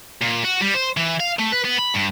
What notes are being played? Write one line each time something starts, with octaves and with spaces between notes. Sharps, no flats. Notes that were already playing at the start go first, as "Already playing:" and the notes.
A#2
F#4
G3
C5
E3
F5
A3
B4
B3
B5
G2